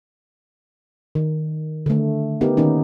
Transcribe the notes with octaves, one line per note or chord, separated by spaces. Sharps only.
D#3
D3 A3
B3 D#4 G4 A#4
D#3 A#3 C#4 D#4